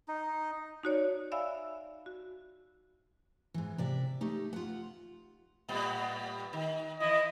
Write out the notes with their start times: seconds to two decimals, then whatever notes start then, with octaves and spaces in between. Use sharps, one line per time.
0.08 D#4
0.83 D#4 F#4 C#5 D5
1.32 D5 E5 F5 G#5 B5 E6
2.06 F#4
3.54 G#2 E3
3.78 C3 D5 E5
4.21 A3 D#4 G4
4.53 F4 F#5
5.69 A2 G3 B3
6.53 D#3
7.00 E3 E4 D#5